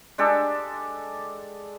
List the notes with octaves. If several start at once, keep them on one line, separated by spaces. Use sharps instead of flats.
G#3 D4 G4 A4